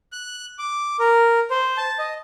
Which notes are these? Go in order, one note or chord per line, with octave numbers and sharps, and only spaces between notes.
F#6
D6
A#4
C5
A5
D#5